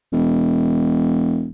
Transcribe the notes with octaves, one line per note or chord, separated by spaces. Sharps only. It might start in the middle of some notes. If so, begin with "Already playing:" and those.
E1